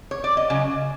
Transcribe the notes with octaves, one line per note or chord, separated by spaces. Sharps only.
C#5
D5
D#5
C#3 F#3